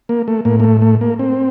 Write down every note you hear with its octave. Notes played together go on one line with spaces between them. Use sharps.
A#3
A3
A2 A#3
A#3
A3
A3
A#3
C4